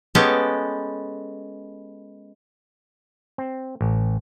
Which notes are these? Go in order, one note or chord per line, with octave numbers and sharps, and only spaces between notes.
G#3 B3 C#4 G4 A4
C4
A1